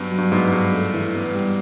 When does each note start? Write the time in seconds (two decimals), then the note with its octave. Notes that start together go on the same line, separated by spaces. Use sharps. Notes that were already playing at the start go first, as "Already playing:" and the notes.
Already playing: G2 F#3 B3
0.11 F#3
0.18 G2
0.32 G#2 B3
0.52 G2 G#3
0.73 A3
0.94 E3
1.14 B3
1.34 G3